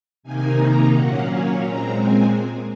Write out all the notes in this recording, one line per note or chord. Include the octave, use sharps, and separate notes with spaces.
C3 D#3 A#3 D#4 G#5
A#5
A#2 F#3 A#3 C#4 F#5
C#5
A#2 G#3 C4 A#5
G#5